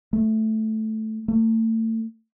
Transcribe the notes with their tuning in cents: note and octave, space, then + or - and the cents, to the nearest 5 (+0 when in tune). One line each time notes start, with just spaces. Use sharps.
A3 -5
A3 +35